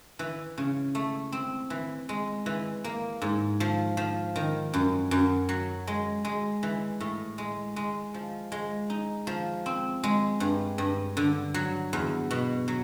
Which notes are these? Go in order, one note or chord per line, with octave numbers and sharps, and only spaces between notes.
E3
C#3
A3
C4
E3
G#3
E3
A#3
G#2
F3
F3
D#3
F#2
F#2
F#3
G#3
G#3
E3
A2
G#3
G#3
F3
G#3
D#4
F3
C4
G#3
G2
G2
D3
F#3
E2
B2
F#3